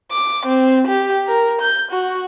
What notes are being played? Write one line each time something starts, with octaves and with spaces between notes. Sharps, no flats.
D6
C4
G4
A#4
G6
F#4